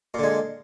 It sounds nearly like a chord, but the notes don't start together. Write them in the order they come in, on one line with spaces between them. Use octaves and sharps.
A#2 D3 G#3